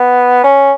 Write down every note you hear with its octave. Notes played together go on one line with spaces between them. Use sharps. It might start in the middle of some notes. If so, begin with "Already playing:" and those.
Already playing: B3
C#4